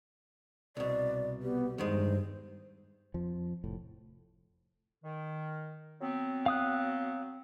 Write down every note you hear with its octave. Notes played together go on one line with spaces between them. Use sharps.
C2 B2 D5
B3 G4
E2 G2 D#3 G#3 C5
F2 F3
F1 A2
D#3
F#3 B3 C4
F5 D#6 F#6